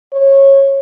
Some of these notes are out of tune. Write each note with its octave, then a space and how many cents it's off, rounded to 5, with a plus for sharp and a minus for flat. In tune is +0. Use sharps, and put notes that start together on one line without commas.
C#5 -20